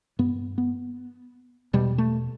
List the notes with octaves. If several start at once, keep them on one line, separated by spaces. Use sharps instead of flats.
G2 B3
B3
E2 B2 G3
A3